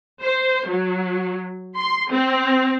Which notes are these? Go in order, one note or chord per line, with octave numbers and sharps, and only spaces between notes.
C5
F#3
C6
C4